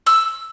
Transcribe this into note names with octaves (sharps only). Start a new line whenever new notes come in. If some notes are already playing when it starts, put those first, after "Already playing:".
E6